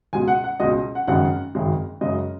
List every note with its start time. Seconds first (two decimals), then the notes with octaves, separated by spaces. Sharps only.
0.13 C#2 B2 G#3 G#5
0.28 F#5
0.44 F#5
0.60 C#2 B2 G#3 D#5
0.95 F#5
1.07 G#1 F#2 C#3 G#3 F#5
1.55 G#1 F#2 C#3 G#3
2.01 F#2 C#3 G#3 D#5